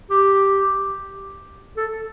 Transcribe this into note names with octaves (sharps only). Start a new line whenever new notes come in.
G4
A4